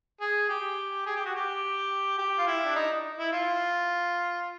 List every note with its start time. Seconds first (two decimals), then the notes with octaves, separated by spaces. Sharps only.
0.21 G#4
0.49 G4
1.06 G#4
1.16 G4
1.26 F#4
1.35 G4
2.19 G4
2.38 F4
2.47 E4
2.65 D4
2.75 D#4
3.18 E4
3.32 F4